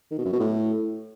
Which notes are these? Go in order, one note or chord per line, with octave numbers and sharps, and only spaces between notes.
D#3
B2
F#2
B2
A2